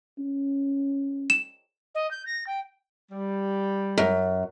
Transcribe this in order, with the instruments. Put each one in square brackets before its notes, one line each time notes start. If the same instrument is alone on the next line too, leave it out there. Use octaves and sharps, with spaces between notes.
[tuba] C#4
[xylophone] E7
[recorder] D#5
G6
A#6
G5
[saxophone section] G3
[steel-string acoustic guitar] F#2